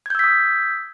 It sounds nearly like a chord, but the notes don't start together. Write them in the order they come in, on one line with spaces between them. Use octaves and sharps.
G#6 G6 E6 B6 D#6